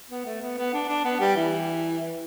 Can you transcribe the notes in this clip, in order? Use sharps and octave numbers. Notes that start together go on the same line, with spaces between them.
B3
A3
B3
B3
D4
D4
B3
G3
E3